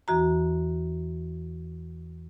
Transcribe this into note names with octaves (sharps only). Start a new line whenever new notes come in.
E2 E3 F#4 A#5